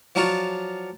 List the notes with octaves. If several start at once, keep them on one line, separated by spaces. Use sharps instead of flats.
F3 F#3 D4 F4 F#4